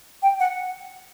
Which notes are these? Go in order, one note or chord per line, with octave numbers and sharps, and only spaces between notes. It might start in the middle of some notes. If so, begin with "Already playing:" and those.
G5
F#5